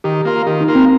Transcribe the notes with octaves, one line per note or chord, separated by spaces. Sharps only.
D#3 G4
A#3 F4 A#4
D#3 G4
D#4
A#3 F4 A#4
C4